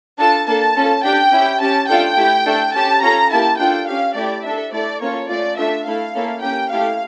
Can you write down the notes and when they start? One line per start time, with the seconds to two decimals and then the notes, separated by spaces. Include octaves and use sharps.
0.18 D4 F4 A4 A5
0.47 A#3 D4 A4 A5
0.76 C#4 F4 A4
1.04 D4 G4 G5
1.32 C#4 E4 G4
1.61 C#4 G4 A5
1.89 A3 D4 F4 A4 G5
2.17 A3 E4 G4
2.46 A3 D4 A4
2.74 C#4 G4 A5
3.02 C#4 F4 A4 A#5
3.31 A#3 E4 G4 A5
3.58 D4 F4 A4 G5
3.87 C#4 G4 F5
4.15 A3 E4 G4 D5
4.44 D4 A4 E5
4.72 A3 E4 A4 D5
5.00 A#3 C#4 F4 A4 C#5
5.28 A3 C#4 F4 D5
5.57 A3 D4 F4 A4 E5
5.85 A3 E4 A4 F5
6.15 A#3 C#4 E4 A4
6.42 A#3 C#4 G4 G5
6.71 A3 E4 G4 F5